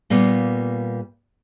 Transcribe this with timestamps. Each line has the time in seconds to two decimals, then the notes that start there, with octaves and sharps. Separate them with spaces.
0.10 A#2 G3 A#3 B3